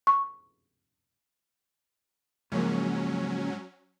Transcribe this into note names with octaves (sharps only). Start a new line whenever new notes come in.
C#6
G#2 C#3 F3 F#3 A#3 C#4